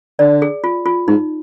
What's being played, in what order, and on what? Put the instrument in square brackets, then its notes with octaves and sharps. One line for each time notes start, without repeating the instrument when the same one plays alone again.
[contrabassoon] D3 [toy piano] D5
[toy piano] G#4
F4
F4
[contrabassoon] G#2 [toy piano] D#4